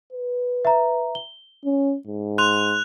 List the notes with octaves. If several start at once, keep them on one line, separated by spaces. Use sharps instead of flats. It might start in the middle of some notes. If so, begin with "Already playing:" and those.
B4
E5 A#5
G7
C#4
G#2
C6 F#6 F7